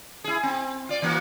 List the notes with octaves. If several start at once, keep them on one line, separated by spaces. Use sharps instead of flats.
E4 G#4
C4
F4 D5
E3 A#3 F#4